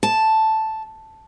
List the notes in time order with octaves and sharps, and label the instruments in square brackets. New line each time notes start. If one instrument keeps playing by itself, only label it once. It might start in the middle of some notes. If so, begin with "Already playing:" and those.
[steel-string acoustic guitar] A5